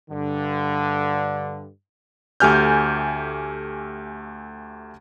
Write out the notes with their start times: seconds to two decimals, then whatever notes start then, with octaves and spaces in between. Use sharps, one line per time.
0.10 G2 D3
2.40 D2 A3 G4 G#5 F6 G6